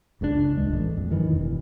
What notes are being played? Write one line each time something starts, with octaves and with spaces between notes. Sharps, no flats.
F#1 C#2 C3 D4
D#1 G#3
A1
F2
F#2 D#3 E3
E1